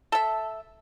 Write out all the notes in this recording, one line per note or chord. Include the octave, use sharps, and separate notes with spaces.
A4 E5